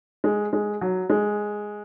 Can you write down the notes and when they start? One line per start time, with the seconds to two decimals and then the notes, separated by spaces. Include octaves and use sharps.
0.24 G#3
0.53 G#3
0.81 F#3
1.10 G#3